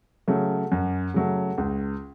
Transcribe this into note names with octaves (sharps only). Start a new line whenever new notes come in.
C#3 F#3 A3
F#2
C#3 F#3 A3
C#2